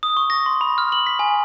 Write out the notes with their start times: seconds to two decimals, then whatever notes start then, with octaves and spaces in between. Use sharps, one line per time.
0.03 D#6
0.17 C#6
0.30 A#6
0.46 C6
0.61 B5
0.78 F6
0.92 F#7
1.07 B6
1.19 G#5